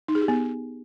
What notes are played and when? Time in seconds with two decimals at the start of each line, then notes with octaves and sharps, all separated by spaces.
0.08 D#4
0.15 G#4
0.22 G4
0.28 B3